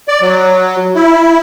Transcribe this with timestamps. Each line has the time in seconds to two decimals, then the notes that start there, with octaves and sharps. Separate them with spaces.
0.08 D5
0.22 F#3
0.95 E4